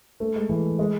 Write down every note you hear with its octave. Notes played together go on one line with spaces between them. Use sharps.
A3
G#3
E3
G#3